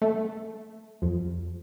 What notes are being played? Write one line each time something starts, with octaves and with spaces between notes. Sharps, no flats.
A3
F2